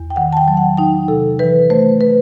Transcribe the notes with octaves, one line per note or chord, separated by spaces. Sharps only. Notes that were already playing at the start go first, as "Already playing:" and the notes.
Already playing: E2
G5
D#3 F#5
A5
G5
F#3
F#5
D#4 G5
C3 A4
E3 B4
A3 C5
B4